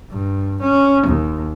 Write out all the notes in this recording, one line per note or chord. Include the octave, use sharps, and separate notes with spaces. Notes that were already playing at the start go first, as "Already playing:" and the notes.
G2
C#4
D#2